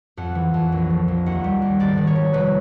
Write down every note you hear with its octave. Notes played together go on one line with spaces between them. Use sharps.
F2 F#5
E3
F2
A#1
F3
A#1
D#2 F#5
G3
D#2
G#1 D5
D#3
C#5
G3
F1 B4